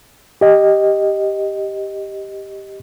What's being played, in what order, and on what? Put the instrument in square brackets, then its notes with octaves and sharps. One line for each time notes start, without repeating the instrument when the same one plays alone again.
[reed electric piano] G4 D#5